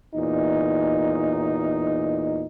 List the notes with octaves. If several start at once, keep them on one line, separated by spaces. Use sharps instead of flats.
E2 A#2 D#4